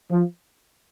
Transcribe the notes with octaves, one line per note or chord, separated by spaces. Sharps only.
F3